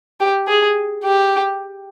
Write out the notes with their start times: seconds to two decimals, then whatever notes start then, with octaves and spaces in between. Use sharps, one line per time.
0.20 G4
0.48 G#4
1.04 G4